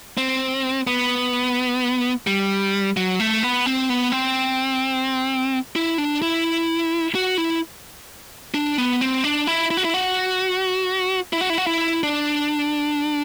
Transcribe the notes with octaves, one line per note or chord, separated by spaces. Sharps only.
C4
B3
G3
F#3
A3
B3
C4
B3
C4
E4
D4
E4
F#4
E4
D4
B3
C4
D4
E4
E4
F#4
E4
F#4
E4
F#4
E4
F#4
E4
D4